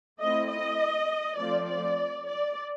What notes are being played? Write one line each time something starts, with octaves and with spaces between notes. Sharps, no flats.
A3 C4 E4 D#5
D#5
F3 A3 C4 F4 D5
D5
D5